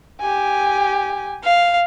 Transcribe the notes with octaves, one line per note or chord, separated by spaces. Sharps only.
G4 G#5
F5